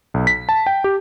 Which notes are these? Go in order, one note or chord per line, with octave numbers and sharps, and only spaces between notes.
B1
B6
A5
G5
G4